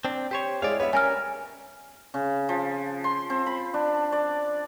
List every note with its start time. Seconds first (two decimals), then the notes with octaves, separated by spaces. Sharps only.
0.05 C4 D4
0.31 G4 C5 C#5
0.62 G#3 E4 G#4 C#5 D5 F5
0.80 B3 C#5 E5
0.93 G3 C#4 A#4 G#5 F6
2.14 C#3
2.49 F3
3.04 C6
3.30 C4
3.46 B5
3.74 D4
4.12 D5